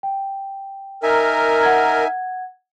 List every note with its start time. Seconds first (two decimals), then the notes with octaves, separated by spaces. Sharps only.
0.03 G5
1.03 D#4 A#4 E5 G#5
1.63 F#5 G#6